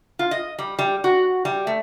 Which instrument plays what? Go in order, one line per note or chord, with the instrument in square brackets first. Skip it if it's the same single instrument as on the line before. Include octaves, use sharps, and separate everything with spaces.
[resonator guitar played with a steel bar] F4
D#5
G3
G3
F#4
G3
A3